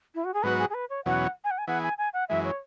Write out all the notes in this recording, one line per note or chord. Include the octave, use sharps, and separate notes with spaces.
E4
F#4
G#4
G#2 F#3 B3 F#4 B4
G#4
G#4
B4
C#5
E2 B2 F#3 C#4 F#5
G#5
F#5
G#5
E3 B3 G#4 F#5
G#5
G#5
F#5
F#2 E3 G#3 E5
C#5